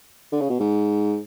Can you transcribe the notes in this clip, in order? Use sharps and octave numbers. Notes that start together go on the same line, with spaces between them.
D3
C#3
B2
G#2